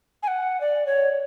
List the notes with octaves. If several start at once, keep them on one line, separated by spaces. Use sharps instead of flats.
G#5
F#5
D5
C#5